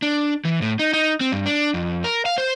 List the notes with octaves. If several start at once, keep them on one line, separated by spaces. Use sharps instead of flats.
D4
E3
A2
D#4
D#4
C4
G2
D4
F2
A#4
F5
C5